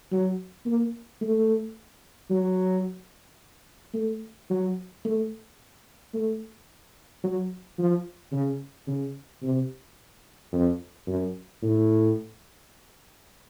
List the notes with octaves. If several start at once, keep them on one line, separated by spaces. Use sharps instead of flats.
F#3
A#3
A3
F#3
A3
F#3
A3
A3
F#3
F3
C#3
C#3
C3
F2
F#2
A2